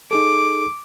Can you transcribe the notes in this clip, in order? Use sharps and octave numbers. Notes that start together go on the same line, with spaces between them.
D#4 G#4 A4 D6